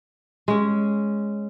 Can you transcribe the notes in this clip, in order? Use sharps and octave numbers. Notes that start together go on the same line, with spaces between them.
G#3 C#4